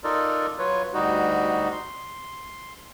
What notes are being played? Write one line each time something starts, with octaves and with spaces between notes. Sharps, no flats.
D#4 F4 A4 A#4 D5
F#3 F4 B4 C#5
D2 G3 D#4 F#4
C6